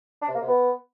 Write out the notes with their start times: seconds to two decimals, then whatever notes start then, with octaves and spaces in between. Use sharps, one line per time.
0.22 D4
0.28 C3
0.35 A#3
0.41 C3
0.48 B3